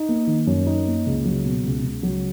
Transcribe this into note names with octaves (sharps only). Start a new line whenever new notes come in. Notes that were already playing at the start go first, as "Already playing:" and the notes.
Already playing: D#4
A#3
D#3
F#2
D#4
A#3
C#2
F#3
B2
C#2
C#2
F#3